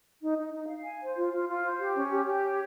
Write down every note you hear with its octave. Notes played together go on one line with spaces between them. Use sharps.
D#4
D#4
D#4
F5
G#5
C5
F4
F4
F4
C5
G4
C#4
G4
G4
C#5